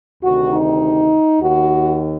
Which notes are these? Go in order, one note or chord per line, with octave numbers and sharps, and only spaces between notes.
D2 C3 D#3 F#4
D#4
D#2 D#3 F#4